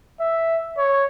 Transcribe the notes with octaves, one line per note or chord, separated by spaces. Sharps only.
E5
C#5